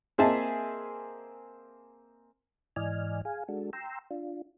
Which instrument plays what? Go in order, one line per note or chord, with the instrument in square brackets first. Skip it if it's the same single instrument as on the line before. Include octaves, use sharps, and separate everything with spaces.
[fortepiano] A#3 C4 G#4 D#5 E5 A5
[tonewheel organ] G#2 E3 D5 D#5 G#5 F6
G#4 F5 G#5
G#3 D4 F#4 A4
G5 A#5 C6 E6
D4 F4